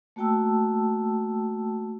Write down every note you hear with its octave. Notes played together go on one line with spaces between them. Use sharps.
A3 A#3 F#4 G5 A5 E6